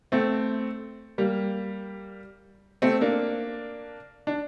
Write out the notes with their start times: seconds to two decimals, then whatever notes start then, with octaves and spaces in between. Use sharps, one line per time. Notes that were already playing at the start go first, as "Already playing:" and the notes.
0.12 A3 C4
1.18 G3 A#3
2.82 A3 C4
3.01 A#3 D4
4.27 D4